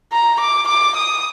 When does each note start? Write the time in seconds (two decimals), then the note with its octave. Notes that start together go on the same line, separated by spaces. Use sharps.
0.12 A#5
0.40 D6
0.68 D6
0.96 D#6